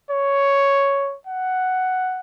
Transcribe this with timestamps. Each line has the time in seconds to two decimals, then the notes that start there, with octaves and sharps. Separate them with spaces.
0.11 C#5
1.27 F#5